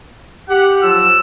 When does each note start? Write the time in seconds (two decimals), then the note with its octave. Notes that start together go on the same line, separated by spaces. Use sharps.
0.49 G4 F#5
0.83 F3 F#3 F4 E6